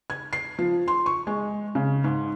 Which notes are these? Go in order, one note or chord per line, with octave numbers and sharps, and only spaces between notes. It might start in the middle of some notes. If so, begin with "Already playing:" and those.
G#6
C7
F3
C6
C#6
G#3
C#3
G#2